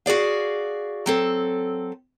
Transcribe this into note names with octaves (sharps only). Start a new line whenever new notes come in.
F#4 G#4 D5 F5
F#3 C4 A4